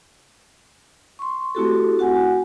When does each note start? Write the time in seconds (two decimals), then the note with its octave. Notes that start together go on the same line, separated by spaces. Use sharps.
1.19 C6 C#6
1.55 A3 C4 E4 F#4 G4 A4
1.99 F#4 F#5 G#5